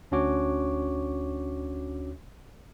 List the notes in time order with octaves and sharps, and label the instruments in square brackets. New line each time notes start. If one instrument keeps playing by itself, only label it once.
[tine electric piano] D2 C#4 D4 F#4 C#5 D6